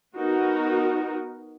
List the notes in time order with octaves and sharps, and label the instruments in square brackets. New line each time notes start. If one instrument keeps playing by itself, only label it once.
[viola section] B3 D#4 F#4 A#4